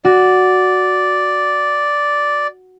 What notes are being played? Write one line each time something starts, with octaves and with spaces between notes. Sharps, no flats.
F#4 D5